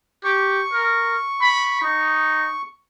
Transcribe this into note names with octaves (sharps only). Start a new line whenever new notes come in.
G4 C#6
A#4
B5
D#4